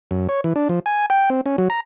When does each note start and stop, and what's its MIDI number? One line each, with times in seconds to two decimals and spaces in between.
0.11 0.27 42
0.29 0.41 73
0.44 0.53 52
0.56 0.68 62
0.69 0.79 53
0.86 1.06 80
1.10 1.30 79
1.30 1.41 60
1.46 1.56 61
1.58 1.68 54
1.70 1.80 82